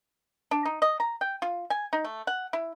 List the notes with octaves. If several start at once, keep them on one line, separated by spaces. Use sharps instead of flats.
D4
D#4
D#5
A#5
G5
F4
G#5
D#4
A3
F#5
E4